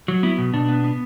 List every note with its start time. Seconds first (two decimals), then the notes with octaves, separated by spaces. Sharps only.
0.08 F#3
0.23 B3 E4
0.38 B2
0.54 B2 D4
0.69 B3
0.84 B3